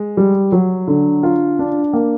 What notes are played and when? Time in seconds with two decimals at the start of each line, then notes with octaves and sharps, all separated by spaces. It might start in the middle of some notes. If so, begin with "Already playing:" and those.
Already playing: G#3
0.17 G3
0.52 F#3
0.87 D3
1.23 F4
1.59 D4
1.93 A#3